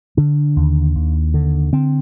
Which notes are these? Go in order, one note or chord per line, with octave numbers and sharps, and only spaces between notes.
D3 D4
D#2
D#2
D3
D3 C4